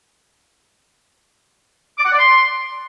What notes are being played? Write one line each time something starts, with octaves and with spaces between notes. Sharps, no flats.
D6
F#5
D5
C6